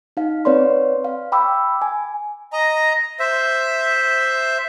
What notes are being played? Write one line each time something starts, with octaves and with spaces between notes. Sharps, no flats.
D#4 F5
C4 B4 C#5 D5 C6
F5
G5 B5 D6 E6
G#5
D#5 A#5
C5 E5